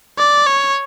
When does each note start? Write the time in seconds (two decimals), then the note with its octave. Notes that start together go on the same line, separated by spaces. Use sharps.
0.17 D5
0.46 C#5